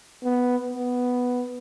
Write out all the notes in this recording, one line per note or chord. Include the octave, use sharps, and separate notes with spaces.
B3
B3